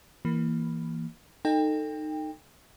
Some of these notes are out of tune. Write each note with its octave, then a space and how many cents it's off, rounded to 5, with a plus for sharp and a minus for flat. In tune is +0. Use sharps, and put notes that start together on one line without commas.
E3 +0 A#3 +0
D#4 -15 A4 +20 G5 +25